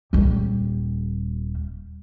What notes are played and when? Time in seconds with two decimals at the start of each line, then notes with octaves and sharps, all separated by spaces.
0.13 D#1 G3